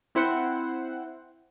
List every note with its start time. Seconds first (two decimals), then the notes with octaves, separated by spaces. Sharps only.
0.15 C4 E4 C5 F#5